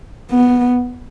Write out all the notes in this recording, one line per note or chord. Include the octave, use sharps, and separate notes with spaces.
B3